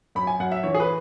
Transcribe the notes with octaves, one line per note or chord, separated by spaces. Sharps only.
F#2 B5
G#5
F#2 F#5
E5
E3 C#5
G#4
B4